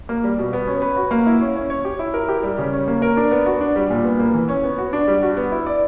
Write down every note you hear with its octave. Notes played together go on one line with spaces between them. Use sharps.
A#3
G3
B2
B3
C#4
B4
F#4
A#3
E4
C#4
C#4
C#5
G4
E4
A#4
G4
G3
C#3
C#4
A#3
A#4
D4
B3
F#4
D4
G3
A#2
B3
A#3
E3
C#4
B3
F#4
D4
G3
F#4
B3
E4
D5